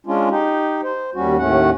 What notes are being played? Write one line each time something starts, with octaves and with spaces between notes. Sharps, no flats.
G#3 C#4 D4 F4
D#4 G4
C5
D#2 G3 C#4 F#4
D#2 A2 A3 C#4 F#5